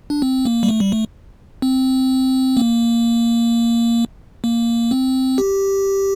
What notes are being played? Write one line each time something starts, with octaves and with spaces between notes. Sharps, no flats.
D4
C4
A#3
G3
A3
G3
A3
C4
A#3
A#3
C4
G4